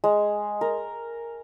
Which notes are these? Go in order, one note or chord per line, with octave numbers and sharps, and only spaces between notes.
G#3
A#4